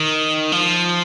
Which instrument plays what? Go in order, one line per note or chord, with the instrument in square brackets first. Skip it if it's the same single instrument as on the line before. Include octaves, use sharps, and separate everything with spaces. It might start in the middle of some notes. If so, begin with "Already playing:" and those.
Already playing: [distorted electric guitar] D#3
F3